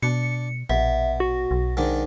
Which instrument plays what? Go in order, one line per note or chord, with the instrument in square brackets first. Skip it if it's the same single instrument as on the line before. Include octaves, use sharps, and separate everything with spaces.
[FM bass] B2 [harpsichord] D4 [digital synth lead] C#7
[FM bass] A#1 [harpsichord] B2 [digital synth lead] E5
[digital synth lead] F#4
[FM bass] B1
[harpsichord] G#2 D#3 D4